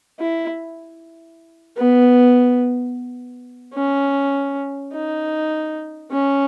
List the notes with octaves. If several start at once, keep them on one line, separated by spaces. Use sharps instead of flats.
E4
B3
C#4
D#4
C#4